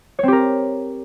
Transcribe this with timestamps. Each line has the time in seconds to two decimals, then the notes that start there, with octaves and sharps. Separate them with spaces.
0.19 C#5
0.23 C4
0.28 G4
0.33 A#4